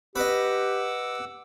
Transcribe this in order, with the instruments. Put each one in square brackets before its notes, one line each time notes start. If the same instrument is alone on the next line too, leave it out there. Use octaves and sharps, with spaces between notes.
[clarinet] G4 [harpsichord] B4 D#5 [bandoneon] F#5 D6 E6